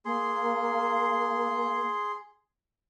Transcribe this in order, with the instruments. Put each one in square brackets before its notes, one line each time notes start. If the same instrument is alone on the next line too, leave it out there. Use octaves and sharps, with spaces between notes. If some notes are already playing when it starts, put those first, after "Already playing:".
[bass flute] A#3 [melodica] G#4 C6